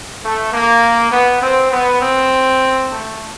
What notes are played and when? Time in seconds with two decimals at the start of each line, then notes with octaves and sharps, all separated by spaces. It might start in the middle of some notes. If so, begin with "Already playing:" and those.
0.24 A3
0.52 A#3
1.12 B3
1.42 C4
1.71 B3
2.02 C4
2.90 A3